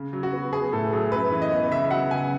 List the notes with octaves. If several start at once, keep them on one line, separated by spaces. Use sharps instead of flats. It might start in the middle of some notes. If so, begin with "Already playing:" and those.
Already playing: C#3
F#3
F#4
B3
B3 G#4
A2 A4
F#3 G#4
F#2 B4
E3
D#5
B3
C#3 E5
F#3 F#5
C#3 G#5